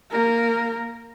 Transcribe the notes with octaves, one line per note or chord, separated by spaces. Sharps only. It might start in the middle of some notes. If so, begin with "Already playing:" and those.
A#3 A#4